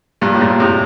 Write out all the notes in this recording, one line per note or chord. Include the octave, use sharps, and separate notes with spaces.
G2 A#2
A2
G2 A#2
A2 C3